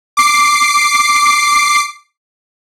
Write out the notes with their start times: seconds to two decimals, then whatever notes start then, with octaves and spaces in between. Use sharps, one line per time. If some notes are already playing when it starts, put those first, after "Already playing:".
0.17 D6 C7